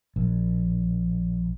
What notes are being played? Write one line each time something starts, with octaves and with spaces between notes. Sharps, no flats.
A#1